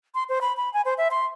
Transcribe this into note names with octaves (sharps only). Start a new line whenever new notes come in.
C6
C5
B5
B5
G#5
C5
E5
C6